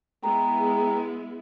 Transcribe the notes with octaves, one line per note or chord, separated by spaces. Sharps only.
G#3 B3 E4 G5 A#5